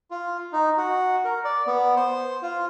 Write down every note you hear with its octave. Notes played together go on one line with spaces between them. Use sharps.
F4
D#4
F#4
A#4
D5
B3
C5
F4